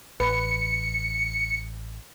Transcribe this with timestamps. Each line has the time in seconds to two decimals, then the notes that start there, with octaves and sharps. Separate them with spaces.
0.20 A1 B4 C#7